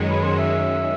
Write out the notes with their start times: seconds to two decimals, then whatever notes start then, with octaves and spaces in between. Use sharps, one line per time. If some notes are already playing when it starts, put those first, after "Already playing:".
Already playing: F#2 D#3 G#3 C#4
0.09 B4
0.24 C5
0.38 E5